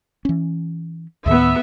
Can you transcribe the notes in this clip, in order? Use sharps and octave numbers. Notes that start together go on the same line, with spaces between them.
E3 C#4
D2 A2 D#3 B3 E5